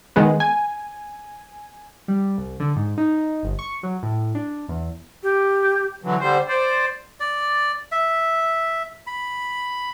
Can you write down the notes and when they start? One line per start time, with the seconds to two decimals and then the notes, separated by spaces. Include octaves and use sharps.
0.16 D#3 G#3 B3
0.40 G#5
2.08 G3
2.38 C2
2.60 D3
2.76 G#2
2.98 D#4
3.43 G1
3.59 C#6
3.83 F#3
4.03 A2
4.35 D4
4.68 E2
5.23 G4
6.04 D3 E3 F#3
6.20 D3 G3 C5
6.48 C5 D5
7.20 D5
7.92 E5
9.07 B5